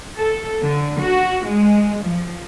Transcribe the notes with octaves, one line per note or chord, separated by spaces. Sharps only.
A4
D3
F#4
G#3
F3